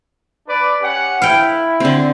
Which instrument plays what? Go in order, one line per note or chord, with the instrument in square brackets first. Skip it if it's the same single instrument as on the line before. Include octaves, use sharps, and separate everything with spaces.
[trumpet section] D4 B4 D5
C#4 G4 F#5
[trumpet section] E4 [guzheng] F5 G5
[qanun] D3 C4